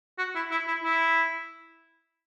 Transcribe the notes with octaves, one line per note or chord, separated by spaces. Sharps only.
F#4
E4
E4
E4
E4